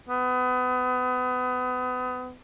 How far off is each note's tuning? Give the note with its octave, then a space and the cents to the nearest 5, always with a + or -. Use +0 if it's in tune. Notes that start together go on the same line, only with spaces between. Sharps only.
B3 +30